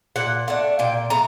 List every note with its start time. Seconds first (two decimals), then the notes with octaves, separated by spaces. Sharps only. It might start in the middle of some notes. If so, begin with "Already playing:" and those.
0.16 A#2 F#5
0.48 A3 D4 F#5
0.79 A#2 G5
1.10 A3 A#5